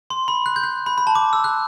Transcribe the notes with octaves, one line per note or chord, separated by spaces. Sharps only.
C6
B5
F#6
G6
F#6
B5
B5
A5
D6
E6
F#6